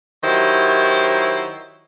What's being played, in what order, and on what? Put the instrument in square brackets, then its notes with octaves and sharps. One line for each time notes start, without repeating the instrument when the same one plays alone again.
[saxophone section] D#3 F#3 E4 G4 C5